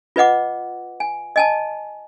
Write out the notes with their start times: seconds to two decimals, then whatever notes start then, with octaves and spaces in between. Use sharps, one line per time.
0.16 F4 B4 D#5 F#5 D6
1.00 G#5
1.36 D#5 G#5 A5